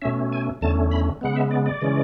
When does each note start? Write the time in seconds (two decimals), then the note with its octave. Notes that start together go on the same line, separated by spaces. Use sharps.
0.02 B2 A3 C#4 E5
0.32 G#5
0.61 E2 D3 A3 C#4 A5
0.91 B5
1.21 C#3 G#3 B3 F#5
1.36 E5
1.51 D5
1.66 D5
1.81 C#3 E3 G#3 C#4